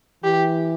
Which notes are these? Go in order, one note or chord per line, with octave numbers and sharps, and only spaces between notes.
E3 G4